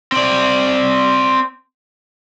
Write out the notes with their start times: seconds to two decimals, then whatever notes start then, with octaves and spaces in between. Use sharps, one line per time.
0.12 C4 D5